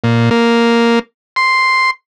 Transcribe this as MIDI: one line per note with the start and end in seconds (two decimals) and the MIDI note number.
0.04 0.29 46
0.31 0.99 58
1.36 1.91 84